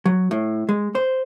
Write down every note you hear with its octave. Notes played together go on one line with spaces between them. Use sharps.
F#3
A2
G#3
C5